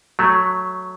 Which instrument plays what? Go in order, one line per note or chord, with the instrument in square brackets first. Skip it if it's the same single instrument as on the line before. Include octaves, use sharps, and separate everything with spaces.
[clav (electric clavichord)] F#3 A3